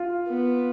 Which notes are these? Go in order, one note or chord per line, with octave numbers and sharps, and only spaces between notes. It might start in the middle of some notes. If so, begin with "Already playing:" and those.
Already playing: F4
B3